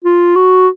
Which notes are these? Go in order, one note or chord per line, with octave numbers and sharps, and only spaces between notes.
F4
F#4